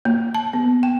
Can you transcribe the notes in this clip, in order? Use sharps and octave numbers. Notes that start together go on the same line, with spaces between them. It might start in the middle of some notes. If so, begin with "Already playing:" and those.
A#3
A5
B3
G5